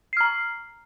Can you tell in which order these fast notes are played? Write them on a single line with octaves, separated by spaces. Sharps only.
C7 F6 A#5